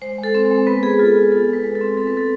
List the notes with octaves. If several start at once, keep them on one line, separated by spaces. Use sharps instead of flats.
G#3 C5
G#3
A4
C4
A4
G#3
B3 B4
B3 G#4
F4 A4
F4
F4 A4
G#3 B4
G#3
A4
C4
B3 A4
B4
B3 A4